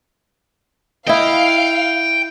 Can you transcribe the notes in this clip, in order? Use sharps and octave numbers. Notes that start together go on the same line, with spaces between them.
E4 D#5 F5 G5